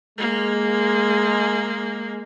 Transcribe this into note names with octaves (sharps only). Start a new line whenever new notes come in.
G#3 A#3